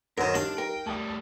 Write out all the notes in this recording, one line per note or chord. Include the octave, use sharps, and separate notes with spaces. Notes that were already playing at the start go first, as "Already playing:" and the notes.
F#2 D#3 A#4 C5
G3 D4 D#4 F5
A#4 G5
A2 G3 A5 D#6